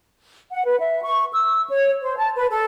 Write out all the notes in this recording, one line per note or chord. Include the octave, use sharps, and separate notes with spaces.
F#5
B4
E5
C#6
E6
C#5
C5
A5
B4
A4